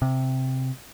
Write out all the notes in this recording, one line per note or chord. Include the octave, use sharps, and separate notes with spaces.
C3